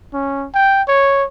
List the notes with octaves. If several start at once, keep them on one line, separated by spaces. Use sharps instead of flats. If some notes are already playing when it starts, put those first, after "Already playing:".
C#4
G5
C#5